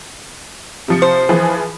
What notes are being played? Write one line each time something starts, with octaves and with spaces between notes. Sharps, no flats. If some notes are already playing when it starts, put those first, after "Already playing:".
C3 F3 C#7
C5
E3 F3 G#4